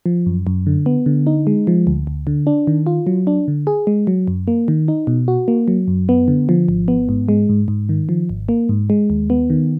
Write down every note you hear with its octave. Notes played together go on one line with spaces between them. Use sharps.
F3
F#2
F#2
D3
B3
D3
D#4
G#3
F3
D2
D2
D3
D4
D#3
F4
F#3
D4
D3
G#4
G#3
F#3
F#2
A#3
D#3
D#4
B2
F#4
A#3
F#3
F#2
B3
D3
F3
G#1
B3
G#2
G#3
G#2
G#2
D#3
F3
G#1
A#3
G#2
G#3
D#2
B3
D#3